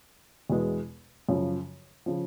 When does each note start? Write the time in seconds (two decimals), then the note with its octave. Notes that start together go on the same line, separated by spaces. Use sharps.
0.50 E2 B2 G#3 B3
1.29 F#2 C#3 F3
2.06 C#3 F3